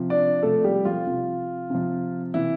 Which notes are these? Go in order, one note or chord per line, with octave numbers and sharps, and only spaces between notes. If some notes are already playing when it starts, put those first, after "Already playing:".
Already playing: C3 F3
D4 D5
C3 F3 A3 A4
G3 G4
F3 F4
C3 F3
C3 F3
C3 E3 E4